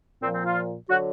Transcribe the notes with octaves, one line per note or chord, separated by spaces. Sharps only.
A#2 F3 C4
C4
F4
D3 F#3 F#4